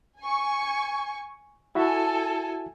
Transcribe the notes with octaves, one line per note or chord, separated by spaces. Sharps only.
G#5 C#6
E4 F#4 A4 E5 G#5